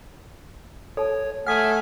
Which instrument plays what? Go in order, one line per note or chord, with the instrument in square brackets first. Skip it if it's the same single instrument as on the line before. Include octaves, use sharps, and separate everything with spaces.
[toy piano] A4 A5 [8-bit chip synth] C#5
[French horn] A3 [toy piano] F#5 D#6 [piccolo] G#5 [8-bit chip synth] F6 B6